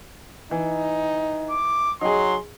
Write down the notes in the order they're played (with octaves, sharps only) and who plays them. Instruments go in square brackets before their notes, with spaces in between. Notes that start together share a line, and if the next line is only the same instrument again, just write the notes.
[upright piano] E3 [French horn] D#4
[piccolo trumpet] D6
[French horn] F#3 [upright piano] D#4 G#4 [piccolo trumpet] C6